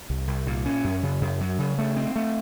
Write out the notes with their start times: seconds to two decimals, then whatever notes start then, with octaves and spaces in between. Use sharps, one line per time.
0.10 C2
0.27 C2
0.47 A#2
0.66 C#4
0.84 F#2
1.03 C#3
1.21 F#2
1.41 F#3
1.59 C#3
1.78 A3
1.97 C4
2.16 A3